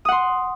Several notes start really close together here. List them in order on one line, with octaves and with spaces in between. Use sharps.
D#6 F#5 C6